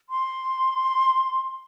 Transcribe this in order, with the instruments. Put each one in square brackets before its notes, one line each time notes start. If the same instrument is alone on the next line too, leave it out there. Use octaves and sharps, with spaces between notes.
[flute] C6